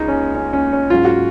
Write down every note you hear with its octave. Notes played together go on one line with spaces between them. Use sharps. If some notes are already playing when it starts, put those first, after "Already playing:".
Already playing: C#2 G#3 D#4
C#4
C#4
C#4
C#4
G#2 F#3 C#4 F4
F#4